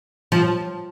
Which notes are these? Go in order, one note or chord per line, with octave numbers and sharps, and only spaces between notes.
F3